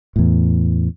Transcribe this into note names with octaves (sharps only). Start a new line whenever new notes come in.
E2 A2